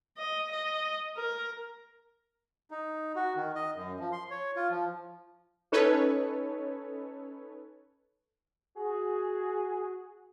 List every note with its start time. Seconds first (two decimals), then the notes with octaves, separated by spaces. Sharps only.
0.17 D#5
0.51 D#5
1.17 A#4
2.71 D#4
3.16 F#4
3.36 D#3
3.55 D#5
3.75 F#2
4.00 F3
4.12 C6
4.31 C#5
4.56 F4
4.71 F3
5.72 C#4 D#4 A4 B4 C#5
8.77 F#4 G#4